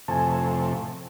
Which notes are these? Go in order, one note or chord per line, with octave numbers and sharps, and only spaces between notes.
F2 A2 C3 G#5 A5